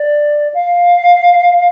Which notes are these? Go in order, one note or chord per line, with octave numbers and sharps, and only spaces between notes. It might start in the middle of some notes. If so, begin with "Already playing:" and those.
Already playing: D5
F5